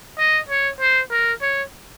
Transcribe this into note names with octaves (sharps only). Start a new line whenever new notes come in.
D#5
C#5
C5
A#4
C#5